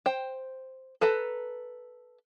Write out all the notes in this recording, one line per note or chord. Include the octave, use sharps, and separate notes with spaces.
C5 G5
A4 B4 A5 A#5